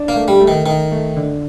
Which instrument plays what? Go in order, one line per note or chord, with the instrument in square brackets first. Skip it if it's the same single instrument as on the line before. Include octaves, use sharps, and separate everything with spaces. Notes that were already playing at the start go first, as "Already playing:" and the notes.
Already playing: [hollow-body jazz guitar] D4
[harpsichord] A#3
[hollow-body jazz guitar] A3
[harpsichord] G3
[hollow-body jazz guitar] A3
[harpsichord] D#3
[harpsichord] D#3 [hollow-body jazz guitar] D#4
[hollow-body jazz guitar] A3
D3